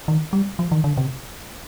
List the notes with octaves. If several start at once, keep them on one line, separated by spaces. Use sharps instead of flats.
D#3
G3
F3
D#3
D3
C3